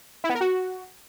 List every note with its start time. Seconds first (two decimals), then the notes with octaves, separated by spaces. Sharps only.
0.24 E4
0.29 B3
0.35 A#4
0.41 F#4